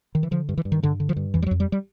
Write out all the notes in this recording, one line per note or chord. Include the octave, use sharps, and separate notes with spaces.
D#3
E3
D3 F3
G2
E3
G2
D#3
G2 D3
D3
F3
G2
F2 E3
G3
F#3
F2
G3
G3